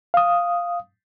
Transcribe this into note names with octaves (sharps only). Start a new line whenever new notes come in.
F5 D#6